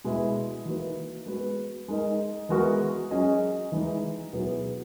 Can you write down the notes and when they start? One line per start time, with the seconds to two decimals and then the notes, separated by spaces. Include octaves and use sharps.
0.04 B2 G#3 B3 E4
0.65 E3 A#3 D#4 F#4 B4
1.26 G#3 B3 F#4 B4
1.88 G#3 D#4 A#4 D#5
2.49 E3 G#3 B3 F#4 A#4
3.11 F#3 C#4 G#4 D#5
3.72 E3 G#3 D#4
4.33 B2 F#3 B3 E4 G#4